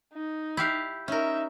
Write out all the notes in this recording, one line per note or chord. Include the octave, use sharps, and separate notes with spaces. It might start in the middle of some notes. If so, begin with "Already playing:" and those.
D#4
E4 G4 F5
C#4 D#4 A#4 E5